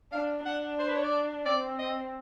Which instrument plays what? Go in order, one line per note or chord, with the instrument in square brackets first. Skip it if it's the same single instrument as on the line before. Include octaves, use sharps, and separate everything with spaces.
[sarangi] D4 [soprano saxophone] F5
[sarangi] D4 [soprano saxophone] F#5
[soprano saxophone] C5
B4
C#5
D5
[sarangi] C4 [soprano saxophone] D5
[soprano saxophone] D#5